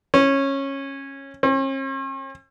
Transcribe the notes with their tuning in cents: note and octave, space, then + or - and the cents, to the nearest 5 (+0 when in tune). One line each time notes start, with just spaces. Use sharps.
C#4 -15
C#4 -45